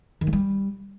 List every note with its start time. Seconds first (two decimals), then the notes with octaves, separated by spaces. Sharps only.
0.21 D#3
0.27 G#3
0.33 G3